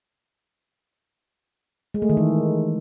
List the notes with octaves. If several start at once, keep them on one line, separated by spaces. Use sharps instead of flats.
G#3
A3
D#3
E3